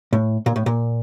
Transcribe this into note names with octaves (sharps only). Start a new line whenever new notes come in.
A2
A#2
A2
A#2